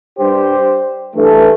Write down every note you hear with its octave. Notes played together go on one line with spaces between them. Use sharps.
G2 G3 G4 C5
G2 E3 A3